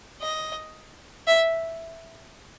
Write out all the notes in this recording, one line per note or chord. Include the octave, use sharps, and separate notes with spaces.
D#5
E5